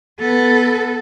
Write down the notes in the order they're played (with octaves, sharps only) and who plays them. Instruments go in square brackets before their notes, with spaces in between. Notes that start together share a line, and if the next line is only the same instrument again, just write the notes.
[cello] B3 A4